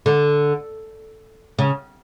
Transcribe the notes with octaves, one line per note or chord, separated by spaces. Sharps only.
D3
C#3